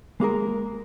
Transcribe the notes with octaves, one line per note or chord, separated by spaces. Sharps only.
G#3 A#3 G#4 A#4